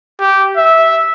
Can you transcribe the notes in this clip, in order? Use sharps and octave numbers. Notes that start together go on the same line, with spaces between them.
G4
E5